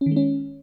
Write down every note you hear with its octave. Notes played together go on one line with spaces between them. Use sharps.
C#4
D#3
G#3
C#4